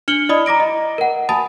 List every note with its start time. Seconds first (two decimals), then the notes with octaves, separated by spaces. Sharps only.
0.08 D4 F6 C#7 F#7 G7
0.29 E4 D5 D#5 B5 D#6
0.46 A#5 D6 A#6 D7
0.60 D#5
0.98 A#4 F#5
1.29 G#5 A5 B5 D#6 A6